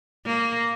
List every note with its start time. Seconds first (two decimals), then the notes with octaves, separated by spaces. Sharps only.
0.26 A#3